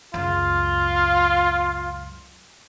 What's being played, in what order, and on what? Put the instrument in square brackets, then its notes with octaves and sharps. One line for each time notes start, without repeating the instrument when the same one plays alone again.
[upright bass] C#2 F#2 [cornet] F4